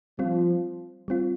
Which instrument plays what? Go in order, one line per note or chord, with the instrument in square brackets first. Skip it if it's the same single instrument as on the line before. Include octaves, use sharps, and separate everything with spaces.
[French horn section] F3 [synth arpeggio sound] G3 C4 F4
[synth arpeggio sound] G3 C4 F4